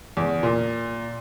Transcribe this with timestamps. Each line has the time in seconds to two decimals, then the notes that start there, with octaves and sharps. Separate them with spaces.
0.17 E2
0.43 A#2